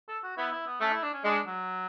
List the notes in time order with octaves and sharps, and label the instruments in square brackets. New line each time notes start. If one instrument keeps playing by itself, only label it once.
[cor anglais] A4
F#4
[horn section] B3 [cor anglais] E4
[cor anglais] E4
B3
[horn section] A3 [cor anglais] C#4
[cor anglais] E4
D4
C#4
[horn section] G#3 [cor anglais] D4
[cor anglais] F#3